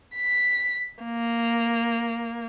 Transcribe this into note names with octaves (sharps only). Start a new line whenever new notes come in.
B6
A#3